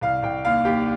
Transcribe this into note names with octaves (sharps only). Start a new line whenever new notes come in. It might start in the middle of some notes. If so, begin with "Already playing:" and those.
C2 F5
C2 G5
D#2 F5
D#2 G4